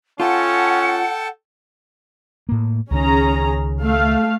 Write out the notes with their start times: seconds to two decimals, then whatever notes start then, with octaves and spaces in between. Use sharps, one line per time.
0.20 C#4 F4 A4 F#5 G5 A5
2.49 A2 A#3
2.91 C#2 D#3 C#4 G#4 A#5
3.82 A3 F5